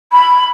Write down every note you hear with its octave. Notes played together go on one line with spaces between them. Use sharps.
B5